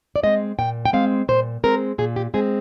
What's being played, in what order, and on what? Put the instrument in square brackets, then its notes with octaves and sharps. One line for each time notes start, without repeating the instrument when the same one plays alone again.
[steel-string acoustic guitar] D5
G#3 C4 D#5
A#2 G5
G5
G#3 C4 F5
A#2 C5
G#3 C4 A#4
A#2 G#4
G4
G#3 C4 G#4